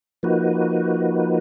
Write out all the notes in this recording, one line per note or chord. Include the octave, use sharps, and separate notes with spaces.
F3 A#3 D#4 F#4 B4